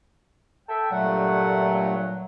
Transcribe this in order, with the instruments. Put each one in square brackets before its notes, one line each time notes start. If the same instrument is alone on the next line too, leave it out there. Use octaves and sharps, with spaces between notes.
[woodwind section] A4 E5 G5
[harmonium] G2 A3 F#5 [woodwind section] A#2 F#3